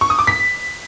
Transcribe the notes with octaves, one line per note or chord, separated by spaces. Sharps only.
C#6
D#6
D6
B6